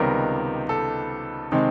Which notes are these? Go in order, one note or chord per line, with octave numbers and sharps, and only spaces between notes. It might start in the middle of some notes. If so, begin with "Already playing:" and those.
Already playing: C#2 C3 D#3 G3 B3 A#4
A4
C3 D#3 G#3 C4